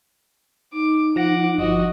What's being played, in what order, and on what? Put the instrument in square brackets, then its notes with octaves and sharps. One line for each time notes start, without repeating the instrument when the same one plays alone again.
[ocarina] D#4 [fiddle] D6
[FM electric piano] F3 A#6 [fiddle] F#5 D6
[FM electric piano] G1 F3 [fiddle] F#4 D#5